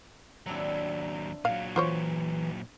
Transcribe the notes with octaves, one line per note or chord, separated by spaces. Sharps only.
D#2 F#3 C4 D4 E4
A#2 F#3 F5
E3 F4 C5 C#5